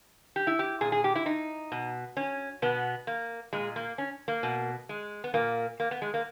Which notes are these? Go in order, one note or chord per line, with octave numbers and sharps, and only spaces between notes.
G4
E4
G4
A#2 G#4
G#4
G4
E4
D#4
B2
C#4
B2 B3
A#3
A#2 G#3
A#3
C#4
A#3
B2
G#3
B3
A#2 A#3
A#3
B3
G#3
A#3